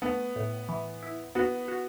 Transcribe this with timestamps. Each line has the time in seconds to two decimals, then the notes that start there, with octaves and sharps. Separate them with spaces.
0.02 A3 B3
0.36 A2
0.69 E3
1.03 E4
1.35 B3 F#4
1.68 F#4